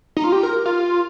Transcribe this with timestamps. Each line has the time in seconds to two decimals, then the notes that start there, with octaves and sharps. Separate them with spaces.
0.17 D#4
0.24 F4
0.32 G4
0.43 A#4
0.66 F4